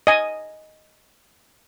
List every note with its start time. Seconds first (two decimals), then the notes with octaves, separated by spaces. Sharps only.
0.07 D#5 G#5